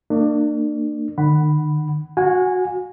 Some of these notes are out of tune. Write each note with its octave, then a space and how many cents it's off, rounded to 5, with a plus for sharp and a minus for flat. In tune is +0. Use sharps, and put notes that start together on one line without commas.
A#3 -35 D4 +30
D#3 -40 F#5 +10 B5 +0
F#4 -10 F5 +45 G#5 -10